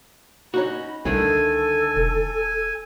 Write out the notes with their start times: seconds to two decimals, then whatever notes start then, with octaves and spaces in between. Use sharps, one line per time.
0.54 C#4 D#4 F#4 B5
1.05 C2 D3 D#3 A3 A4 G#5
1.96 E1